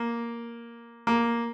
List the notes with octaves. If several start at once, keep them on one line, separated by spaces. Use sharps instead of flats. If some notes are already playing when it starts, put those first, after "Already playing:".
Already playing: A#3
A#3